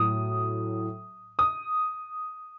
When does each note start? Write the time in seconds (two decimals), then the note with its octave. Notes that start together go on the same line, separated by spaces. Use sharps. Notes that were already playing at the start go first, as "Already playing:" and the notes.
Already playing: A2 F#3 D#6
1.39 D#6